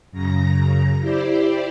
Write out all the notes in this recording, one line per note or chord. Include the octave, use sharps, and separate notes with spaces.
F#2 C#3 A#5 A#6
E4 G4 C5 D5